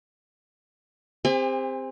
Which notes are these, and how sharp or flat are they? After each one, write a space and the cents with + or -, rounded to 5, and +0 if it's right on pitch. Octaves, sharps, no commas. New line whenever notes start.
C4 +0 G4 +40 G#5 -40